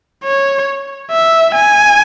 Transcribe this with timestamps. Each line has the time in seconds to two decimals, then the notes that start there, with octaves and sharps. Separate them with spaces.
0.24 C#5
1.11 E5
1.55 G#5